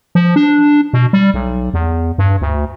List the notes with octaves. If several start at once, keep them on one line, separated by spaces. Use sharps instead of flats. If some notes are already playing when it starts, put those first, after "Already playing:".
F3
D4
B2
G3
B1
E2
G2
D2